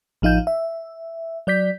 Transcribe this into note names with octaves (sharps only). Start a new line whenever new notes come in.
A1 F3 D#4 F5 G6
E5
F#3 D5 G6 B6